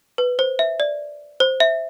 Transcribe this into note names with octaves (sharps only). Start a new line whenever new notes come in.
B4
C5
E5
D5
C5
E5